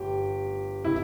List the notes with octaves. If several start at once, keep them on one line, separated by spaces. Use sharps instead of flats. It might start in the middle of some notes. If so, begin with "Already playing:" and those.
Already playing: G1 G4
E4